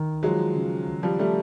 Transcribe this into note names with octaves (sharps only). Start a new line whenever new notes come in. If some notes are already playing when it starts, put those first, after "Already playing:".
Already playing: D#3
F3 F#3 G#3
C#3
D#3
F3 G3
G3 A3